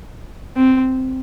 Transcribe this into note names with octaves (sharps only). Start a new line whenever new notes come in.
C4